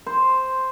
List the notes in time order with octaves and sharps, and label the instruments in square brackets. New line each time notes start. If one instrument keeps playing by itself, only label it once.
[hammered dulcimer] C5